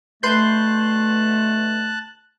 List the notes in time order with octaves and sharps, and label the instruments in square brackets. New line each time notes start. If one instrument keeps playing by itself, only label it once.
[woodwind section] B2 D3 A3 [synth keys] B4 C6 G6 [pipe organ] A5 F#6